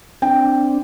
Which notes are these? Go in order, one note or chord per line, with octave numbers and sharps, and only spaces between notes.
C4 D4 G5